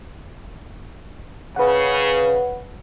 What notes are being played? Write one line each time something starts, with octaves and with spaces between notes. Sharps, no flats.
C#3 B4 F#5